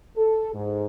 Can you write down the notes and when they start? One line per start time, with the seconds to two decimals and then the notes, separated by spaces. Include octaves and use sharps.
0.17 A4
0.54 G#2